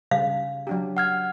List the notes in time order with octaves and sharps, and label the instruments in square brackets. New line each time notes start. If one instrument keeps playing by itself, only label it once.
[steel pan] C#3 G3 C#4 [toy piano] F5
[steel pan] F#3 D4 G4
[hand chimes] F#5 F6 G#6